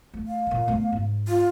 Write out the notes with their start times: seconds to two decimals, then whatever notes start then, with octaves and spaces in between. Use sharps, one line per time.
0.14 A3
0.27 F5
0.47 A#2 D#3
0.68 A3 B3
0.93 G#2
1.28 F4